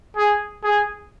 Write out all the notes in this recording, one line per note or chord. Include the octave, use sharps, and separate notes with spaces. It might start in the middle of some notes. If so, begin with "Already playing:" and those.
G#4
G#4